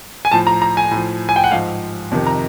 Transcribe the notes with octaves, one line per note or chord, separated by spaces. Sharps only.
G#5
A2 F3 A5
A#5
A#5
G#5
A2
F3
G#5
G5
F#5
G#2 F3 F5
F2 C3 D#3
A#5